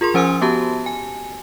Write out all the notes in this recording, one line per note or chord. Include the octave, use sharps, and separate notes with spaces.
F4 G#4 A#4 C6
F3 C#4 C5 G#5 D#6 E6
B3 F#4 G4 A5
G#5